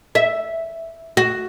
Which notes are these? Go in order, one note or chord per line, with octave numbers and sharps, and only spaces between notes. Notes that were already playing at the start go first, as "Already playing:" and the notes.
E5
F#4